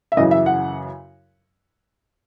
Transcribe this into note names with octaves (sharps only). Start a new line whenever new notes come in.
E5
F#2 C#3 E3 D#5
E5
F#5